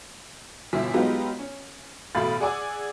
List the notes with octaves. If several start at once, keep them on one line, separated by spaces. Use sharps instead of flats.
G1 B2 E3 E5 B6
F#3 G#3 B3 D#4 F4 G4
C#4
A1 B2 A3 F5 B5 A6
G#4 D5 F#5 G#5 D6 E6